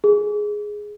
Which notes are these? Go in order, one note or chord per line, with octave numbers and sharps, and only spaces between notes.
G#4